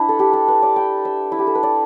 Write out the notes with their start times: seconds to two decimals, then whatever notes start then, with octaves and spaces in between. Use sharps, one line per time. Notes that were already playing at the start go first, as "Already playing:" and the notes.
Already playing: D4 E4 B4
0.09 A4
0.19 G4
0.33 A4
0.48 B4
0.63 D5
0.76 G5
1.05 E5
1.32 E4
1.39 G4
1.47 A4
1.55 B4
1.63 D5